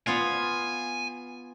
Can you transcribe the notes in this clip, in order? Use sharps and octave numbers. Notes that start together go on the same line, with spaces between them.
B3 F4 F5 G#5